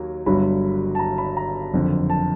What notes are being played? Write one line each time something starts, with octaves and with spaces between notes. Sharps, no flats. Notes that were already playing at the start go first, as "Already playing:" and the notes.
Already playing: D#2 F#3
G1 G2 D3 F#3 B5
A5
A#5
B5
A#5
F#1 F2 D3
A5